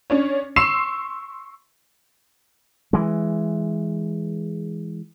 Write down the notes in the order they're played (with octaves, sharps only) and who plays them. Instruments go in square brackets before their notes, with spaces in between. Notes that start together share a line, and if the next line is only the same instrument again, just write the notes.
[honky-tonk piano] C#4 D4 C#5
C6 C#6 E6 C7 E7
[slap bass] E3 G#3